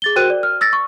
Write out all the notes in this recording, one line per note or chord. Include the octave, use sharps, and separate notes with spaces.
G#4 A6 G7
F#4 A#4 C5 G5 F#6 D#7
D5
F6
E6 A6 A#6
C#6